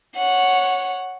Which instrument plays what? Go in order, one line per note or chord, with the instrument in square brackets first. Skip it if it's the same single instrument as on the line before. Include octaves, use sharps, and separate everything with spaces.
[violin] C#5 F#5